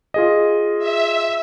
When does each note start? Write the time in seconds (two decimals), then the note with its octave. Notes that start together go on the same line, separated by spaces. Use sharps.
0.14 F4 G#4 D#5
0.79 E5